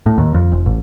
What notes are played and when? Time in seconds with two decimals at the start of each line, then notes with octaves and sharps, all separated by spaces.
0.06 A2
0.18 D#2
0.34 F2
0.52 F1
0.66 A1